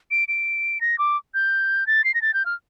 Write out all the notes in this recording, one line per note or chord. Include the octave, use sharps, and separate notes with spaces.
D7
D7
A#6
D6
G6
A6
C7
A#6
A6
G6
F6